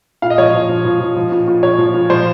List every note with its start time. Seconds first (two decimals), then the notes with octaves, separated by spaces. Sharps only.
0.22 A#2 F5
0.30 D#5
0.38 F3 C#5
0.46 D#5
0.54 F3
0.69 F3
0.85 F3
1.00 F3
1.16 F3
1.32 A#2
1.48 A#2
1.63 A#2 C#5
1.78 F3
1.94 A#2
2.10 F3 C5